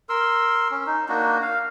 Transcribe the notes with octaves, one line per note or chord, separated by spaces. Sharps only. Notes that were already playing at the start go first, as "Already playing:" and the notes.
A#4 C6 E6
C#4
D#4
A#3 D4 D#4 F#4
F5